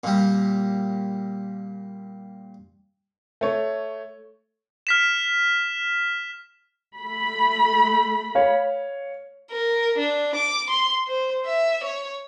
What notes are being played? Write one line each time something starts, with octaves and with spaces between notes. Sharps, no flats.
A#2 G3
A3 C#5
F6 B6 E7
A3 B5
C#5 F5
A#4
D4
D6
C6
C5
E5
C#5